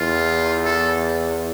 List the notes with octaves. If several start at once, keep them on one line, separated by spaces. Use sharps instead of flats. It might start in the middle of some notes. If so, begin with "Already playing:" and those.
Already playing: E2 F4
A4